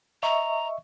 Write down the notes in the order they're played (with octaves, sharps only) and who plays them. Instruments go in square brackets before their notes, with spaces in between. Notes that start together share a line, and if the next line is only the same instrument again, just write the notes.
[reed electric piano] D#5 E5 C#6 [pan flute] A#5